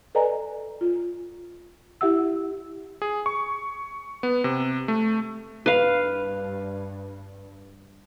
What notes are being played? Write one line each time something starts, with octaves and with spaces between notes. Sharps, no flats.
A4 B4 D5 D#5 G#5 A#5
F4
E4 G4 E5 F#5 E6
G#4
C#6
B3
C3
A3
G2 B4 F5